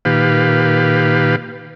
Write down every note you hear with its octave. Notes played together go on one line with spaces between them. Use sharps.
A#2 D#3 G4 B4 F5